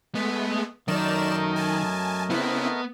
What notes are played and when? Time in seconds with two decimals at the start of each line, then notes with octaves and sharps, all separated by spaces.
0.15 G#3 A3 B3
0.88 F#2 D#3 F#3 A3 A#4 D5 D#5 E7
1.56 G#5 A5
2.30 C#3 B3 C4 E4